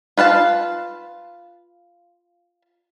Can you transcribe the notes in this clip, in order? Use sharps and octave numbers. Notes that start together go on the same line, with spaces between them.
F4 B4 F5 A5